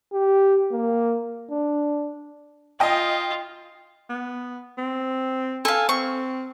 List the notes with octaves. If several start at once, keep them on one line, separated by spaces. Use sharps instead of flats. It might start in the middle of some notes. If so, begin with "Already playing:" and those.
G4
A#3
D4
F4 D#5 G5
B3
C4
A4 F5 G#5
C4 C#6